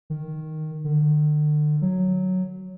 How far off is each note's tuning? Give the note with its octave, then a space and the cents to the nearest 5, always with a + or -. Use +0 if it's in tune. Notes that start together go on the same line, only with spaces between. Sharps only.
D#3 +0
D3 +40
F#3 +0